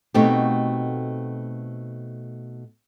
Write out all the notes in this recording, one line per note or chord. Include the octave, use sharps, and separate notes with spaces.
B2 A3 C4 D#4 F#4 G4